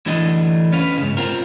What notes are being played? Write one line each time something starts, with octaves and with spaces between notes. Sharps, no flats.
D2 E3 A3 D4 D#5
C#4 B4 F5
G#2 C#3
C4 F4 A#4